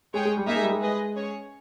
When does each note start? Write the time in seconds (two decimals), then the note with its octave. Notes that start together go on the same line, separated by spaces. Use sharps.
0.14 G#3 G#4 C#5 G5
0.25 G#3
0.37 G3
0.47 A#3 D#4 G4 A#4 E5 G#5
0.56 G#3
0.63 G3
0.72 G#3
0.82 G#4 B4 D#5
1.15 C#4 G#4 C#5